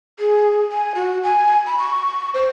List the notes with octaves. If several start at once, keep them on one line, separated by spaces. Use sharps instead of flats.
G#4
G#5
F#4
G#5
B5
C#6
C5